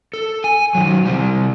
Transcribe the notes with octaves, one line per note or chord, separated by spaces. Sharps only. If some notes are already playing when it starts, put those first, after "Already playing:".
A4
G#5
D#3 F#3
C3 G3